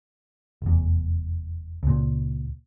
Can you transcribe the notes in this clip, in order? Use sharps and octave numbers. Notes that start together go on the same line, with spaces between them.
F1 E2
C#2 A#2